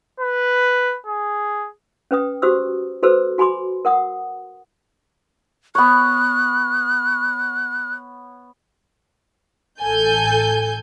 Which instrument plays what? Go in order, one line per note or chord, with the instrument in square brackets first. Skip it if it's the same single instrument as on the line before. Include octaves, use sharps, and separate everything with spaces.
[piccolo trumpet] B4
G#4
[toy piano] C#4 B4 G5 D#6
F#4 G4 C5 D#6 E6
F#4 A4 B4 C5 E6
F#4 G#5 B5 C6 D6
A#4 F#5 D#6
[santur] B3 C#5 [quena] F#6
[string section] A1 A4 G#5 G6